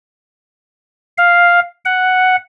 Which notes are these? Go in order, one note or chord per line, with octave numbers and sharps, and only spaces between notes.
F5
F#5